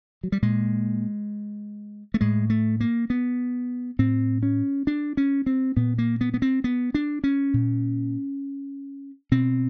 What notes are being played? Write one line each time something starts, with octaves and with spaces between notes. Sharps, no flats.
F#3
G3
A#2 G#3
A3
A2 G#3
A3
A#3
B3
A2 C4
C#4
D4
C#4
C4
A#2 B3
A#3
B3
B3
C4
B3
D4
C#4
A#2
B2 C4